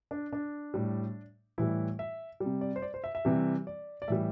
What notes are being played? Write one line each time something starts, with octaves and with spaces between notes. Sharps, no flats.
D4
D4
A2 G3
A2 E3 G3 E4
E5
G3
C3
D5
C5
D5
C5
E5
E5
C3 E3 G3
D5
D5
A2 E3 G3 E5